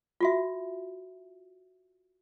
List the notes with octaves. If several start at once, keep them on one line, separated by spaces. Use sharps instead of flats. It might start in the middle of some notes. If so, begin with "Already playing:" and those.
F4 F#4 E5